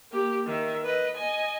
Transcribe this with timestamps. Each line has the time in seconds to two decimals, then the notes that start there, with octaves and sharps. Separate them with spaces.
0.12 A#3 G4
0.46 D#3 E5
0.85 B4 D#5
1.16 D#5 G#5